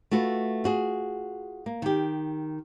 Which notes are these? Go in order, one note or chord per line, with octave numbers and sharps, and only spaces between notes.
A3 F4 F#4 B4
F4 F#4 G#4
A#3
D#3 G4